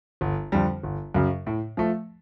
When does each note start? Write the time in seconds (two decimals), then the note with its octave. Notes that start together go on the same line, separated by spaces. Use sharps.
0.21 G1
0.52 F2 D3 G3
0.83 G1
1.14 F#2 C#3
1.47 A2
1.77 F3 A3